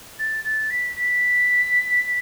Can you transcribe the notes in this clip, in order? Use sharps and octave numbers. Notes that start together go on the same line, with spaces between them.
A6
A6
B6
B6